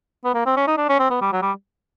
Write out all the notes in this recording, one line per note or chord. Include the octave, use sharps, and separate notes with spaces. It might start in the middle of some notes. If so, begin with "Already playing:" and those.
B3
A#3
C4
C#4
D#4
D4
C#4
C4
B3
G3
F#3
G3